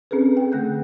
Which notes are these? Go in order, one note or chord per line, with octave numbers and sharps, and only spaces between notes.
C4 C#4 G#4 A4 B4
G5
D3 A3 F#6 G6